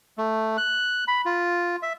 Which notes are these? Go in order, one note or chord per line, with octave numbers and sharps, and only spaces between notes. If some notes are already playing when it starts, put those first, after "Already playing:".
A3
F#6
B5
F4
E5